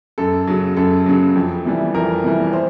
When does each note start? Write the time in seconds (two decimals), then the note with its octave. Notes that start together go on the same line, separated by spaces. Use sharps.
0.18 F#2 A4
0.47 C#3 F#3
0.76 F#2 A4
1.06 C#3 F#3
1.35 F2
1.65 C3 E3 G3
1.94 F2 A#4
2.24 C3 E3 G3
2.53 C5